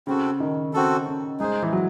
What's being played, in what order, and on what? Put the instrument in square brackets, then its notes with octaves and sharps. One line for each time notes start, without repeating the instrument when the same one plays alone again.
[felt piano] C#3 [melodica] C4 F#4 A4
[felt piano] D#3
[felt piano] C#3 [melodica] C4 F#4 A4
[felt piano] C#3
[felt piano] G#3 [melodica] D#4 G#4 C5
[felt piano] E3
F#3